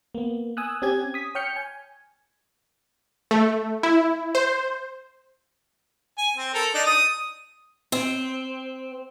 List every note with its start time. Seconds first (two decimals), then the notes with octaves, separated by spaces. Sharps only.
0.15 A#3 B3
0.57 G#5 D#6 E6 F#6
0.82 C4 C#4 G4 G#5 G#6
1.14 D#6 B6
1.35 C#5 G5 F6 G6 C#7
1.56 G#5
3.31 A3
3.83 E4
4.35 C5
6.18 G#5
6.36 C4
6.54 A4 A#4
6.74 D4 D#4
6.86 D#6
7.92 C4